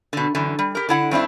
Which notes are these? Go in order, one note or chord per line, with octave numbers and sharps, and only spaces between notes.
B2 D3
F#2 D3 E3
G3
G4 A#4
D3 E4 F#5
G2 C4 D4 E4